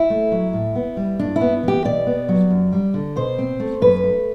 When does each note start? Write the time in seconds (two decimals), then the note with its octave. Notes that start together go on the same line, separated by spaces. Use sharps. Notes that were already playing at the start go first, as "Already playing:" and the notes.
Already playing: E4
0.10 A3
0.32 F#3
0.53 A2
0.75 B3
0.97 G3
1.19 G2 D4
1.36 E4
1.41 B3
1.63 E3 G4
1.85 B2 D5
2.07 B3
2.29 F#3
2.50 F#2
2.72 G3
2.94 D3
3.16 B2 C5
3.38 C4
3.60 A3
3.81 F#2 B4
4.04 A3